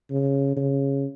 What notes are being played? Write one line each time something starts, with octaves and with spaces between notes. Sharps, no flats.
C#3
C#3